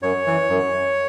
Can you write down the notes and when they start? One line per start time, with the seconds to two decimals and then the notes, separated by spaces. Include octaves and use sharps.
0.02 F#2 C#5
0.27 E3
0.50 F#2